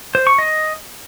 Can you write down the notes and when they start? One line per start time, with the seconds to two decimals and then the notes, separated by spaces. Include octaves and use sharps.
0.15 C5
0.27 C#6
0.39 D#5